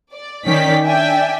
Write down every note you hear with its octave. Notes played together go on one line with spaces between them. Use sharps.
D5
D#3 C#4 D5 G5 B6
D4 D5 E5 G5 G#5